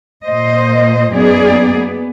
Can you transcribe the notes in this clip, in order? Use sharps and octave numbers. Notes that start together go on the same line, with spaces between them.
A#2 C5 D#5
F#2 A#3 B3 D#4 G#4 D5
B3